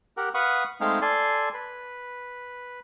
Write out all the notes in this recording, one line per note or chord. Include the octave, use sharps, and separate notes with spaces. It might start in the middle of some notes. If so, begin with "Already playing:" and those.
G4 A#4 F#5
B4 F5 F#5 C#6 D#6
G#3 A3 C4 D#4 G#4 F5
A4 D5 G#5 C6
B4